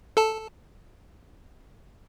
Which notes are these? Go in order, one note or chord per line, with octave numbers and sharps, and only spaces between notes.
A4 A5